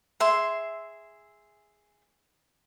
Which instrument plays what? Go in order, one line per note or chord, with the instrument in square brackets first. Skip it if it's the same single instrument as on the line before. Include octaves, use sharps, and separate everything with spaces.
[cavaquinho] G#4 E5 C6